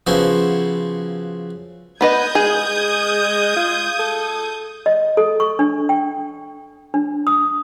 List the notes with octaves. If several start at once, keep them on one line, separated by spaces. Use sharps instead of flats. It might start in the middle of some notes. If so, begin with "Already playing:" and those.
C#3 F3 B3 E4 F#4 C5
B3 B4 D#5 D#6 G6 G#6
G#3 G#4
F4
A4
D#5
A4
C#6
D4
G5
D4
D#6